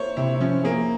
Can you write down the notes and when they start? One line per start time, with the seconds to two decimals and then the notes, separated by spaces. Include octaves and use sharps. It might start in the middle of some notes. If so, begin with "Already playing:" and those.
Already playing: A#3 E4 C5 C#5
0.17 C3 E4
0.35 E4
0.40 F3 C#4
0.64 A#3 G#4